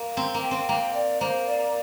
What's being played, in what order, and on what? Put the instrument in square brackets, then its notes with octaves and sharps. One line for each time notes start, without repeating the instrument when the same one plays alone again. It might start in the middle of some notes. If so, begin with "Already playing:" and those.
Already playing: [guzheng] A#3
[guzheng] C4 [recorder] A#5
[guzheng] A#3
[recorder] G5
[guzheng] C4
[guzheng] A#3 [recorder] G5
[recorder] D5
[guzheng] A#3 [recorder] C5
[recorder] D5